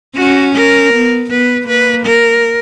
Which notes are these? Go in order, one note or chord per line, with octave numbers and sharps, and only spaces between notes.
C#4 F#4
A#4
B3
B3 B4
A#3 B4
A#4